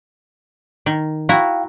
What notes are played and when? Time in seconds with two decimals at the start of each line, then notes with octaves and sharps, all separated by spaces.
0.86 D#3
1.29 E4 F#4 F5 G5 A#5